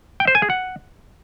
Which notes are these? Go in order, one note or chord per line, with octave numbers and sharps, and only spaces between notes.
G5
C5
G#5
G#4
F#5